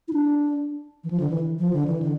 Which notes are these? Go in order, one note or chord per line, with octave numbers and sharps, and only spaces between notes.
E4
D4
E3
F3
D3
E3
F3
D3
E3
D3